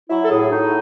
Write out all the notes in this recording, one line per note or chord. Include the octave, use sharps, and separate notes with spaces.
F#3 E4
A4
A2 G#4
A2 D#4